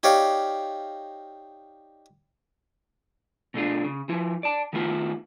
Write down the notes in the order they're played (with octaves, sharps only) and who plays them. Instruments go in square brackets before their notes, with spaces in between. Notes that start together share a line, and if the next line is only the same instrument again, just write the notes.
[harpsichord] D#4 G4 C#5 D5 F5
[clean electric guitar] B2 A3 D4 F4
C#3
F3 E4
D5 A5
D#3 A3 B3 E4 F4